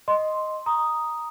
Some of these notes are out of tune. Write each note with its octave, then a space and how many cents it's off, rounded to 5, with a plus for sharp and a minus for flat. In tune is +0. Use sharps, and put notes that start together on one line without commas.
D#5 +0 C6 +0
A#5 +5 D#6 +0